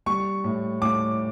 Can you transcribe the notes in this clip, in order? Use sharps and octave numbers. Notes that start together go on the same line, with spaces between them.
G3 C#6
A2
A2 D6